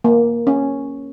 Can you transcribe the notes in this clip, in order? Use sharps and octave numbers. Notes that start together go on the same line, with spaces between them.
A#3
C#4